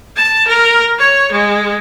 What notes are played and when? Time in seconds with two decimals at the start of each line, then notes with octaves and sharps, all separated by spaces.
0.16 A5
0.47 A#4
0.99 C#5
1.32 G#3